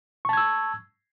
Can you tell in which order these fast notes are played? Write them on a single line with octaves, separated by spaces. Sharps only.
C#6 A5 G#6 E6